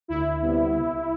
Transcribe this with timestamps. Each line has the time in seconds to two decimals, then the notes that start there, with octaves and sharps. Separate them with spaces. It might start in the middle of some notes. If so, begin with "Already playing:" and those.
0.08 D2 E4
0.42 C3 G3 B3
0.76 C2